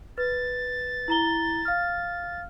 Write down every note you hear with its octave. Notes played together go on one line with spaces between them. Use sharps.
B4 A6
E4 A#5 G7
F5 F6